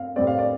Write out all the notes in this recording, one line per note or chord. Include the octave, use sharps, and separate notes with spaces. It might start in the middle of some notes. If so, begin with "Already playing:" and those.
Already playing: C4 F5
A2 G3 C4 D5
F5
D5